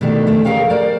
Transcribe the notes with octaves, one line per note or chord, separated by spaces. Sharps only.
B2 D#3 G#3 A3 D4 G4
F2 D#3 A3
G#4 A#4 C#5 F5 G5
A#4 C5 D5